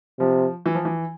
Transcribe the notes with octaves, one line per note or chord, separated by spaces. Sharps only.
C3 F3
E3
F3
E3